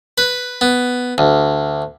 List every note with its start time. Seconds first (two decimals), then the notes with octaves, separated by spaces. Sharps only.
0.18 B4
0.61 B3
1.18 D2